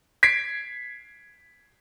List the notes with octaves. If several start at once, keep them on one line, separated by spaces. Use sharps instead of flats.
G#6 B6 C7 D7